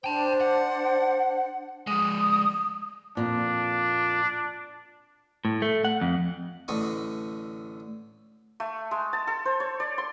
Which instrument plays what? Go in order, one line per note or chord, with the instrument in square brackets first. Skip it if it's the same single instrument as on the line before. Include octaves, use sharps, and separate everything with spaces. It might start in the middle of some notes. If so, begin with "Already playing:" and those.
[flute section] D4 C5 [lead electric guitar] G5 A5
[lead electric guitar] F#5
[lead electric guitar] F3 G#3 [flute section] D#6
[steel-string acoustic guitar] F2 A#2 [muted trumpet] D4
[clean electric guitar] A2
A3
F#5
F2
[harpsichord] A1 D3 D#5 C#6
[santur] A3
G#3
A5
A4
C5
C#5
D5
C6